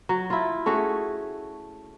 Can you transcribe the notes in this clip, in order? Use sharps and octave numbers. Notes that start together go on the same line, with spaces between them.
F#3
E4 F4
A3 C#4 F#4 G#4